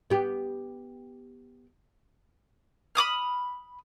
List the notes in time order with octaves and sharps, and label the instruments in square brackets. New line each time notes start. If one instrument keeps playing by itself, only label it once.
[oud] B3 G4
[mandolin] B5 D6 D#6 F6